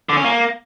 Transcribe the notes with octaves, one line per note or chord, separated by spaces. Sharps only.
D3
C#4
A#3